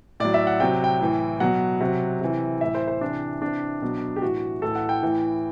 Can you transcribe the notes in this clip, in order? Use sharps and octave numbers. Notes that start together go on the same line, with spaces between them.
A2 F#3 D5
E5
F#5
C3 F#3 G5
G5
A2 E3
B2 F#3 F#5
C3 F#3
C3 E3
A2 E3 E5
C5
C5
C3 E3 D4
C3 E3 D4
B2 F#3
G4
A2 E3 F#4
A2 E3 A4
F#5
G5
A2 E3